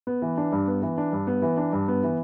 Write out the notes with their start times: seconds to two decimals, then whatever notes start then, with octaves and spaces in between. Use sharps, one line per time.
0.07 B3
0.22 E3
0.37 D4
0.52 G2
0.68 B3
0.82 E3
0.98 D4
1.13 G2
1.27 B3
1.42 E3
1.57 D4
1.73 G2
1.88 B3
2.03 E3